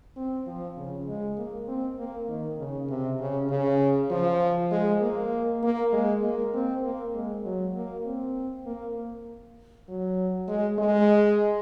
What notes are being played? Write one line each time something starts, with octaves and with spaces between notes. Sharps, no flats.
C4
F3
C#3
G#3
A#3
C4
A#3
D#3
C#3
C3
C#3
C#3
F3
G#3
A#3
A#3
G#3
A#3
C4
A#3
G#3
F#3
A#3
C4
A#3
F#3
G#3
G#3